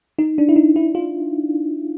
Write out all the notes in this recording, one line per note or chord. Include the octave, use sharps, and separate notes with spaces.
D#4
D4
E4
D#4
E4
F4